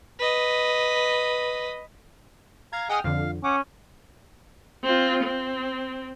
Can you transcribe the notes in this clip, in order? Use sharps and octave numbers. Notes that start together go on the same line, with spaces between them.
B4 D#5
F5 A#5 G#6
G#4 D#5 F#5 G5 D#6 F6
F2 D3 F5
C#4 F#5 D6
C4 F4
C4